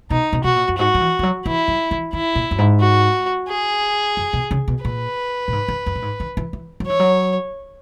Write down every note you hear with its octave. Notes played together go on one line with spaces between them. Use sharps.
B2 D#4
B2
B2 F#4
A#2
F#2
G#2 F#4
F#3
E3
E3
F#3
E3 E4
F#3
E3
D#3 E4
A#2
F#2
G#2
F#4
G#4
F#2
B2
C#3
B2
A#2 B4
A#2
G#2
F#2
F#2
A#2
G#2
D#3
E3
E3
F#3
E3 C#5
F#3